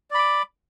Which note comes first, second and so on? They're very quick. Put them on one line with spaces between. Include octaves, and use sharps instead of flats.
D5 B5 D6